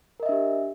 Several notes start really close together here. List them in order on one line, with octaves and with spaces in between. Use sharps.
A#4 D#5 E5 D4 G4